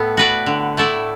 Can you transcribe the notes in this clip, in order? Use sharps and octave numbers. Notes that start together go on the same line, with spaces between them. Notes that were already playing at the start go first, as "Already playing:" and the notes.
Already playing: A2 B3 A4
F#4 B4 D5
D3
A3 E4 A4 D5